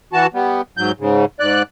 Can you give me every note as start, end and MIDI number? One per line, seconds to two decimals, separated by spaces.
0.13 0.27 52
0.13 0.27 66
0.13 0.27 81
0.34 0.62 55
0.34 0.62 59
0.77 0.92 44
0.77 0.92 54
0.77 0.92 91
1.00 1.25 44
1.00 1.25 49
1.40 1.63 44
1.40 1.63 74
1.40 1.63 90